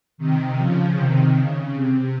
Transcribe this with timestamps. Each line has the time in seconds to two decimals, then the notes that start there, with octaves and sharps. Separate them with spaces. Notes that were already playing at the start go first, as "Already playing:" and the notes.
0.18 C3 D#3
0.57 C#3 F3
0.96 C3 D#3
1.35 C#3
1.74 C3